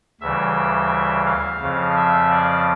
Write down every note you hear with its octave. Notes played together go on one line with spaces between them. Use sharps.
D2 C#3 E3 G3 E5
F5
F2 C#3 F3
E5
D5